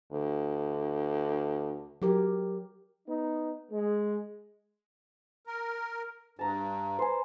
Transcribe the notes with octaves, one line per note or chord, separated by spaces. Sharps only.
D2
F#3 G4 A#4
B3 D#4
G#3
A#4
G2 A5 A#5
B4 C5 G#5